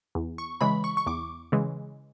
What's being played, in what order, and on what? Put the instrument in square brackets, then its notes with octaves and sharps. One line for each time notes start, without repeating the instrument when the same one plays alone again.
[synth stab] E2
C#6
C#3 E3 G#3 B5
C#6
C#6
E2 D6
C#3 E3 G#3